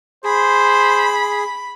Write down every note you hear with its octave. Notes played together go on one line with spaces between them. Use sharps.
G#4 C5 B5